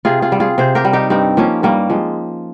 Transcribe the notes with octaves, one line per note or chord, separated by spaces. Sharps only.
C3 F4 G#4
F4 G#4
G3
F4 G#4
C3 G#4 C5
G4 A#4
G3
D#4 G4
G2 C4 D#4
F3 A#3 C#4
G2 G3 A#3
F3 G#3